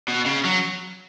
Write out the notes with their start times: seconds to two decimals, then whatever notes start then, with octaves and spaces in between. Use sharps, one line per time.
0.08 B2
0.26 C#3
0.45 F#3